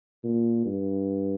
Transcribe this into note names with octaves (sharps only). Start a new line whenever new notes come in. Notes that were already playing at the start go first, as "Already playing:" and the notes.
A#2
G2